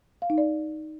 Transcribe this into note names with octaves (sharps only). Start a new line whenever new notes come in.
F5
D#4
D5